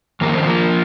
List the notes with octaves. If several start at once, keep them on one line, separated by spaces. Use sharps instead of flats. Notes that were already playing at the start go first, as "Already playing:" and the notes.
F2 D#3 A#3
C4
F3 A#3